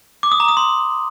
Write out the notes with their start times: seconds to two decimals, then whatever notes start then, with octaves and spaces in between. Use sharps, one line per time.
0.23 D6
0.32 D#6
0.40 A#5
0.48 D#6
0.57 C6